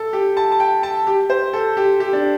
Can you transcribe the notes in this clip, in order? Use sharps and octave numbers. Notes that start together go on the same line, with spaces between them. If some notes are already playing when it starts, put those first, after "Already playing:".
Already playing: A4 A5
G4
A5
A5
G5
A5
G4
C5
A4
G4
G4
D4